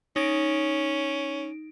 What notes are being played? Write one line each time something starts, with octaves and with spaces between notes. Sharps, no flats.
C#4 D#4 D7